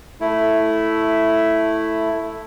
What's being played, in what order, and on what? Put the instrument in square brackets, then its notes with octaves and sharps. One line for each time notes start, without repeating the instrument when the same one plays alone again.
[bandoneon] A3 E4